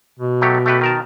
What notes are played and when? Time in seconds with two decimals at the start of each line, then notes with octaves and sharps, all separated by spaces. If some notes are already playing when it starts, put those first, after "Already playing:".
0.20 B2
0.42 F#3 A3 G4
0.66 A3 G4 B4
0.81 D#3 A#4 A5